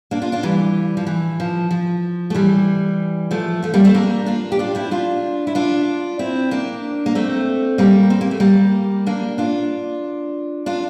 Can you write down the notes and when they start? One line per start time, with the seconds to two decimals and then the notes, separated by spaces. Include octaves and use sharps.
0.11 A#3 D4
0.22 D4 F4
0.32 D4 F4
0.43 E3 G3
0.97 F3
1.07 E3
1.40 F3
1.71 F3
2.30 A3
2.35 E3 G3
3.31 F3 A3
3.63 F3 A3
3.74 G3 A#3
3.84 A3 C4
3.95 A#3 D4
4.26 D4 F4
4.52 G4
4.59 D4 F4
4.75 C4 E4
4.91 D4 F4
5.47 E4
5.55 D4 F4
6.19 C4 E4
6.51 A#3 D4
7.06 A#3
7.15 A3 C4
7.78 G3 A#3
8.10 C4
8.21 A#3
8.31 A3
8.40 G3 A#3
9.06 A#3 D4
9.38 D4 F4
10.66 D4 F4